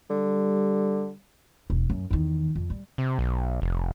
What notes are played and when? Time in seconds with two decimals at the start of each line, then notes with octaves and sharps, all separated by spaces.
0.10 D3 G3
1.70 E1
1.90 F#2
2.11 E2 D#3
2.56 F2
2.70 G3
2.98 C3
3.19 B1
3.62 F1